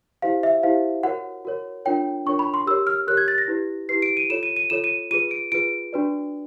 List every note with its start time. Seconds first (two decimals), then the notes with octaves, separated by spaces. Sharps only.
0.22 E4 G4 C5 F5
0.43 E5
0.63 E4 G4 C5 F5
1.03 F#4 A#4 C#5 F#5
1.45 F#4 A#4 C#5
1.85 D4 F4 A#4 C#5 G5
2.26 D4 F4 A#4 C#5 C#6
2.39 B5
2.54 C6
2.67 G4 A#4 C#5 E6
2.87 F6
3.07 G4 A#4 C#5 F#6
3.17 G#6
3.28 A6
3.38 A#6
3.48 E4 G4 B4
3.89 E4 G4 B4 C7
4.02 D7
4.17 D#7
4.30 F4 A4 C#5 E7
4.43 D#7
4.56 D#7
4.70 F4 A4 C#5 E7
4.84 D#7
5.11 F4 G#4 B4 D#7
5.31 D7
5.52 F4 G#4 B4 D7
5.93 D4 F#4 B4 D5